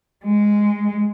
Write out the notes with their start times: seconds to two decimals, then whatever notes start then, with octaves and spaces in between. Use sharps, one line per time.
0.25 G#3